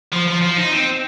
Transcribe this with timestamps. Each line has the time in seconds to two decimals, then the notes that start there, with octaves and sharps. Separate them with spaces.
0.13 F3
0.28 F3
0.42 F3
0.57 D#4
0.72 C4